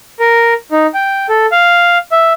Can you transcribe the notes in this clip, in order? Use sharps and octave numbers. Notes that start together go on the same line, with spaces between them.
A#4
D#4
G5
A4
F5
E5